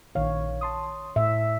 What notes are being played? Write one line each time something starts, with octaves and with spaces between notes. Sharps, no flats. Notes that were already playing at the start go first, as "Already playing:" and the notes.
A#1 D#3 C#5 F5
A5 C6 D#6
A2 E5